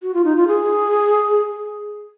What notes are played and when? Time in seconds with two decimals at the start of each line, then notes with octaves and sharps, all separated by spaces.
0.02 F#4
0.14 F4
0.25 D#4
0.36 F4
0.47 G#4